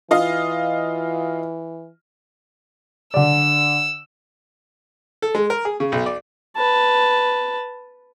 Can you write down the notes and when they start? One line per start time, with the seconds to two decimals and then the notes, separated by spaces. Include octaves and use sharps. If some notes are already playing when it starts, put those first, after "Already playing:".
0.11 E3 F4 D#5 F5
3.14 D3 D5 E6
5.22 A4
5.35 G#3
5.50 A#4
5.65 G#4
5.80 C#3
5.92 B1
6.06 D5
6.57 B4 A5